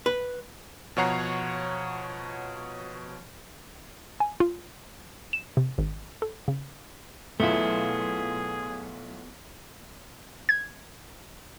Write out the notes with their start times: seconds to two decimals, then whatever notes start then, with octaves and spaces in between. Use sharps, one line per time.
0.06 B4
0.97 B2 F3 C#5 F#5 A#5 C7
4.20 G#5
4.40 F4
5.33 E7
5.57 C3
5.78 G#1
6.22 A4
6.48 C#3
7.40 B1 A3 B3 E4 F4 G#4
10.49 G#6